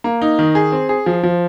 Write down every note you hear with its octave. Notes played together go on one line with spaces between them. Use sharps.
A#3
D#4
D#3
G#4
C4
G#4
F3
F3